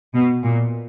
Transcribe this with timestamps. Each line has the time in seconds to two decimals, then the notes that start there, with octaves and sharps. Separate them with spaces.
0.14 B2
0.44 A#2